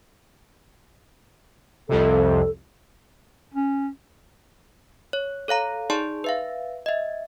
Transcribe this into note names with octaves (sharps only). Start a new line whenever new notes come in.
C2 F2 C3 A4
C#4
C#5
A4 C#5 F5 A#5
D#4 G#4 D5 A5 C6
B4 E5 F5
D#5 E5